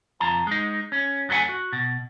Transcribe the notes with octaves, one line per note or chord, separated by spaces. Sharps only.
F2 F4 A5 A#5
G#3 D#4
C#4
F#2 F#3 A3 A4 F#5 G#5
F#4
B2